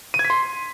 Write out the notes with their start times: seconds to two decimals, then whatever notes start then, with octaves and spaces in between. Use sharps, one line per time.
0.14 D#7
0.19 G#6
0.25 B6
0.30 C6